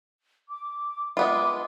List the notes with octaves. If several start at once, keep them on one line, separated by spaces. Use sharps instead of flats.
D6
G#3 B3 F4 E5 D6